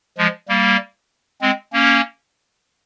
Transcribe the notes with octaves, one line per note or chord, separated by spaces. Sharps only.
F3 G#3
G3 A#3
G#3 C4
A#3 C#4